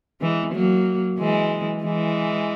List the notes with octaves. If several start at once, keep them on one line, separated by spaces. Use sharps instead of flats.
E3 G#3
F#3 A#3
E3 G#3
E3 G#3